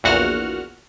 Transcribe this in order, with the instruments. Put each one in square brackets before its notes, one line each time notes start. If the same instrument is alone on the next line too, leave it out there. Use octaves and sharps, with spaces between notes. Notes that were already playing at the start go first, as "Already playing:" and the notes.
[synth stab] A#1 E2 A#2 F#4 F#5 F6